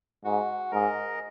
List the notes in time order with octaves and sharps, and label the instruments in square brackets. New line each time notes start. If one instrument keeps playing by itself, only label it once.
[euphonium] G#2 [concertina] F#4
[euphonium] G#2 [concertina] A#4 D#5